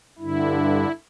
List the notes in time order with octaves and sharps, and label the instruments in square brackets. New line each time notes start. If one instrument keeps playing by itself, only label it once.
[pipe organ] G2 D3 E4